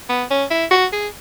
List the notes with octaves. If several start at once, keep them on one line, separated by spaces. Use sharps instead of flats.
B3
C#4
E4
F#4
G#4